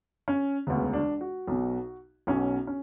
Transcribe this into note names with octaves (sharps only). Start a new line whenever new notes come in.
C#4
E1 D2 C#3 B3
D4
F#4
B1 B2
B1 B2 C#4
C#4